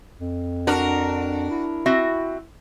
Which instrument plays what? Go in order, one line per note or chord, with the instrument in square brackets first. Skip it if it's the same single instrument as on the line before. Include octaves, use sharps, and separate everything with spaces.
[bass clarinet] F2
[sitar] D4 A#4 [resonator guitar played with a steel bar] F#4
[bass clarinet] E4
[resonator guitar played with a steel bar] C4 F#4 E5